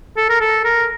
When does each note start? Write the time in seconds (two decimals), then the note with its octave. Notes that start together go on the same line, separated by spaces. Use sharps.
0.17 A4
0.29 A#4
0.41 A4
0.65 A#4